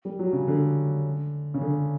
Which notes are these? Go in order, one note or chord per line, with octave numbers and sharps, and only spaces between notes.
G3
F#3
C#3
D3
C#3
D3